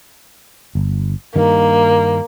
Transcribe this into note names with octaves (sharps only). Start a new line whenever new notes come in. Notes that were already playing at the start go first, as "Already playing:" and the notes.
G1
G2 D#3 A#3